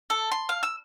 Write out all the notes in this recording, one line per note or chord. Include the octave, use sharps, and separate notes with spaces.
A4
C6
F5
E6